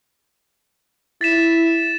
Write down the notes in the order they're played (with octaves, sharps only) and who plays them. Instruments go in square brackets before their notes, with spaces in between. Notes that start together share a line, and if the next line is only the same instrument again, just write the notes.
[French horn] E4 [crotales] A6 B6 E7